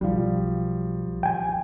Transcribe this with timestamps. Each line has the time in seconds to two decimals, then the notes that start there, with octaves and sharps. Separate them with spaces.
0.01 B1 F3 G3
1.23 G5 G#5